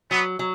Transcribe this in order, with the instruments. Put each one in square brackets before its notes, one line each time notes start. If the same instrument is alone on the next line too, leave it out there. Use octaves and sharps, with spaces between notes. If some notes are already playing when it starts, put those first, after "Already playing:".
[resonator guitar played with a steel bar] F#3 [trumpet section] B3
[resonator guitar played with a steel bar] F#3